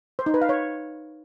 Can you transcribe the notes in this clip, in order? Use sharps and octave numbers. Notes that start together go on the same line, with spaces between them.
C5
D#4
B4
F5
C#5